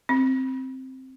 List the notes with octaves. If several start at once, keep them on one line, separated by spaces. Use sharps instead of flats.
C4